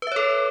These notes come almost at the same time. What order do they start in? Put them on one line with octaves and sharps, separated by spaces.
B4 E5 C#5 A4